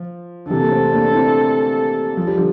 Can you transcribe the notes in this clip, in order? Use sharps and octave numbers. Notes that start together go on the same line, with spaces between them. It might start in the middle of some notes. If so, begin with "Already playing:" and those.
Already playing: F3
D3
C3 E3 A4
A#3
A3 C4
A#3 D4
D4
C4 E4
F3
G3
D3 F3